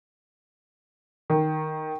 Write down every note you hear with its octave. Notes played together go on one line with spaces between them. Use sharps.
D#3